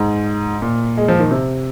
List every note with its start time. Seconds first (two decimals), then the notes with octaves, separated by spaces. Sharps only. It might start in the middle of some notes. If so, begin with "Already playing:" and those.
Already playing: G#2
0.62 A#2
0.97 G#3
1.08 F3
1.20 D#3
1.31 C3